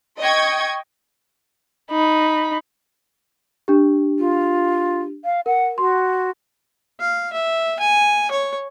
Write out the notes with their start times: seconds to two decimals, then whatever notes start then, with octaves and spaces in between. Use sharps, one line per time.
0.20 D#5 G5 C#6 G#6
1.91 D#4 B5
3.68 D4 G4
4.19 F4
5.25 F5
5.46 A#4 F#5
5.78 F#4 C6
7.00 F5
7.33 E5
7.80 G#5
8.31 C#5